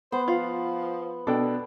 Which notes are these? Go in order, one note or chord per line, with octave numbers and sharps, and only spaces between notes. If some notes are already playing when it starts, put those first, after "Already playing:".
B3 C5
F3 F4 F5
B2 D4 A4 G5